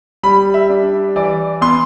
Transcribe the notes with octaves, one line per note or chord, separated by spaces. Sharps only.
G3 B5
E5
D4
E3 D5
B3 C6